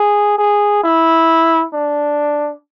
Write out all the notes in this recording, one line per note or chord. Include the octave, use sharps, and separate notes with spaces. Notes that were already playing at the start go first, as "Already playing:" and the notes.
Already playing: G#4
G#4
E4
D4